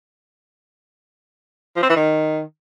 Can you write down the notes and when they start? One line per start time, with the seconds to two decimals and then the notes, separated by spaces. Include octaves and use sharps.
1.76 F3
1.83 C4
1.89 E3
1.96 D#3